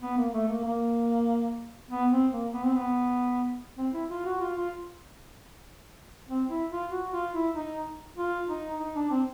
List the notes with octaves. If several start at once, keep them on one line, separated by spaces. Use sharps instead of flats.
B3
A#3
A3
A#3
A#3
B3
C4
A#3
B3
C4
B3
C4
E4
F4
F#4
F4
F4
C4
E4
F4
F#4
F4
E4
D#4
F4
D#4
D#4
D4
C4